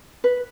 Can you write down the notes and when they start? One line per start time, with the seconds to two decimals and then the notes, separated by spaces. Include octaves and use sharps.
0.24 B4